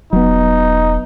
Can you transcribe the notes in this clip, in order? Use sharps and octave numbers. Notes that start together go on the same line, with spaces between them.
E1 F#3 B3 D#4